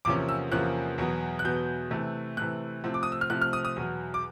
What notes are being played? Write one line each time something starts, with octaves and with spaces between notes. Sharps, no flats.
E2 C3 F3 A#3 C#4 D6
E6
E2 C3 F3 A#3 C#4 F#6
E2 B2 F#3 B3
F#6
E2 B2 F#3 B3 G6
C3 E3 A3
C3 E3 A3 F#6
C3 F3 A3 C4
D6
D#6
E6
F6
C3 F3 A3 C4 F#6
F6
D#6
D#6
E2 B2 F#3
D6